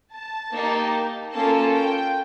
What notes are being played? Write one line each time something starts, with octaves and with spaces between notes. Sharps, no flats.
A5
A#3 D#4 G4
A#3 C#4 F4 A4 A5
G5